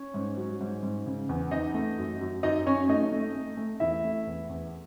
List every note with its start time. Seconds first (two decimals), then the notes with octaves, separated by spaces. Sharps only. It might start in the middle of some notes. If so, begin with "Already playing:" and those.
Already playing: C#4 C#5
0.14 G#2
0.37 F#3
0.61 G#2
0.83 G#2
1.06 C#3
1.29 E2
1.51 E2 D#4 D#5
1.74 A3
1.98 F#2
2.21 F#2
2.43 F#2 D#4 D#5
2.66 F#2 C#4 C#5
2.89 A3 D#4 D#5
3.12 A3
3.35 A3
3.57 A3
3.80 E2 E4 E5
4.04 A3
4.27 E2
4.49 E2